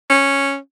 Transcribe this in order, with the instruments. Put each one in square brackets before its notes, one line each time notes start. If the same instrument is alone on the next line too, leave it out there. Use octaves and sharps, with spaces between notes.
[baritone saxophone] C#4